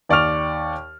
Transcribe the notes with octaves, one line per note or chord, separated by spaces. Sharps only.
D#2 D5 C#6 F6 F7